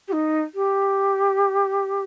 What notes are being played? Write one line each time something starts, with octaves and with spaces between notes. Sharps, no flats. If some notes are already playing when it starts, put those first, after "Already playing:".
G4
D#4
G4